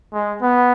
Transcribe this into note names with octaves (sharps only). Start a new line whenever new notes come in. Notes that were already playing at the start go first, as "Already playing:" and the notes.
G#3
B3